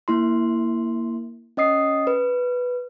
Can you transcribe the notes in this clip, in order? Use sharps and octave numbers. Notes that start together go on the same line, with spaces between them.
A#3 E4 C6
C#4 D#5 D#6 C7
B4